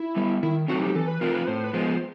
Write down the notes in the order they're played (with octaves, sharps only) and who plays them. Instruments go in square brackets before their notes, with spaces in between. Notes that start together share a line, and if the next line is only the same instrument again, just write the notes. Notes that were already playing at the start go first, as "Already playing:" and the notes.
Already playing: [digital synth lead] E4
[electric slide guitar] G3 B3
[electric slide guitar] D#3 [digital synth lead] E4
[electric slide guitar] F#3 A3 C4 D#4 [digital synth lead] F#4
[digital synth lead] G4
[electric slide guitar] E3 [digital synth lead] A4
[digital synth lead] B4
[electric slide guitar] A3 C4 F4 [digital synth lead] A#4
[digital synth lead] B4
[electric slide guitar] A2 [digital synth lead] C5
[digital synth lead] B4
[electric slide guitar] F3 G#3 B3 [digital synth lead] C5